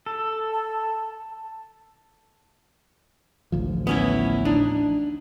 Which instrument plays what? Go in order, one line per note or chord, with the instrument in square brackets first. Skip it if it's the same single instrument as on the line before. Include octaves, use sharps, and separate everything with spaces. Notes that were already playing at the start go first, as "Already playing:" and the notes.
[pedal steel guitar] A4
[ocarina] A5
[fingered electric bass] A1 D2 F3
[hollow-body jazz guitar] B3 C#4 E4
D4 D#4